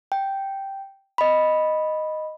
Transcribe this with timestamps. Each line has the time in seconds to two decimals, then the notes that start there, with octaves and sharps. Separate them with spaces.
0.12 G5
1.18 D#5 B5